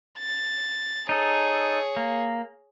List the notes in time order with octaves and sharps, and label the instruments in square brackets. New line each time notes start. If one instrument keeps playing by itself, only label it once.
[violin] A6
[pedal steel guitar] D#4 A4 [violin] G#4 C#5
[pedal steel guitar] A#3